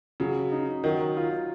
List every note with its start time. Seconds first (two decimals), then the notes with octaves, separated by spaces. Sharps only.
0.20 C#3 F#3
0.52 D#4
0.84 D#3 F#3
1.17 F4